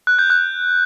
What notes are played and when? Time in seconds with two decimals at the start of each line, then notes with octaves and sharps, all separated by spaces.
0.07 F#6
0.19 G6
0.30 F#6